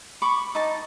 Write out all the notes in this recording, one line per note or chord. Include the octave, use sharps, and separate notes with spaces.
B5 C#6 D6
D#4 A5